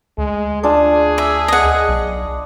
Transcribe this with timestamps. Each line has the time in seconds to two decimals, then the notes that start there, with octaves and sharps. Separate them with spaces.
0.18 D2 G#3
0.63 D4 F4 G#4 A5
1.18 E5
1.48 D#5 F#5
1.88 B1